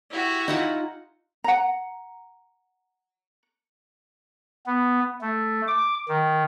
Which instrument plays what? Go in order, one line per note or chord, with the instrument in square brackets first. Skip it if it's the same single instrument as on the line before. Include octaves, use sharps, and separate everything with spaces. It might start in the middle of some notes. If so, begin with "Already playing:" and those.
[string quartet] E4 F#4 G4
[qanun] D#4 F4 F#5
[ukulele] F#5 A#5
[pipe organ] B3
A3
D6
D#3